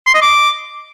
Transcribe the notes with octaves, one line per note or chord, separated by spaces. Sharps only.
C6
D#5
D6